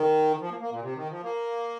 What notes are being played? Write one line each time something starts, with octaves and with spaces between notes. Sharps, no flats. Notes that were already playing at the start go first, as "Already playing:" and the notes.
Already playing: D#3
F3
A#3
A#3
A#2
C3
D#3
F3
A#3